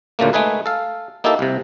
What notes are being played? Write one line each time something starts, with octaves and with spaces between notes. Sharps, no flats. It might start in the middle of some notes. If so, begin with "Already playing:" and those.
D2 A#2 C#3 A3 A#3
G#3 A3 D#4 G#4 B4
A4 F5
A#3 D#4 E4 G4 A4
C2 C3